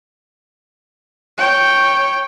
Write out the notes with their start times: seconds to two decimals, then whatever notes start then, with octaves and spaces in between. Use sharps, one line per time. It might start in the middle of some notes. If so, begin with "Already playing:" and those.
1.38 C#5 G5